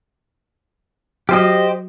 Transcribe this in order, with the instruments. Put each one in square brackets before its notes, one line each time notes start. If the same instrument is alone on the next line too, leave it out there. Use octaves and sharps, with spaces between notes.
[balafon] F#3 F#4 [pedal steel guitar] G4 C5 D#5